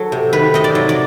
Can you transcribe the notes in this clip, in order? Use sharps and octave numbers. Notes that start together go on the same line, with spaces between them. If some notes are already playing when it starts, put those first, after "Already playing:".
Already playing: F#3 A4
C3
D#3 B4
C3 D#5
D5
F#3
D5